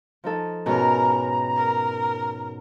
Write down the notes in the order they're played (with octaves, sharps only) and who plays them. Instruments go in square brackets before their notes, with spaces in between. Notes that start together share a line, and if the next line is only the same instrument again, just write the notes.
[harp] F3 D#4 A4
[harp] G#2 B2 C#4 [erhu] A#4 [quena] A#5
[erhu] A#4